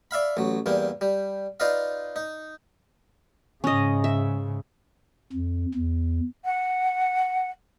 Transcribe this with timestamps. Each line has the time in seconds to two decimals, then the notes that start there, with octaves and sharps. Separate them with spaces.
0.11 D5 E5 F5 B5
0.37 A1 F#3
0.66 E2 G3 A#3
1.01 G3
1.60 D#4 F4 B4 D5 D#5 F5
2.16 D#4
3.64 G#2 C#3 C#4 D#5
4.04 E5
5.32 F2
5.74 E2
6.45 F#5